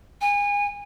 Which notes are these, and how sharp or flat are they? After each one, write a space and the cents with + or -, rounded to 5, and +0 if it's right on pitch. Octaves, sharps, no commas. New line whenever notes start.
G#5 -30